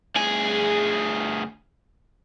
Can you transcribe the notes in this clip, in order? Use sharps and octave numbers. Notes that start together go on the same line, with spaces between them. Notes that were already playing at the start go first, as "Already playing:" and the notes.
D2 G#4